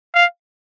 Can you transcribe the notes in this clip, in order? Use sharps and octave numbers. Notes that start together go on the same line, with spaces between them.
F5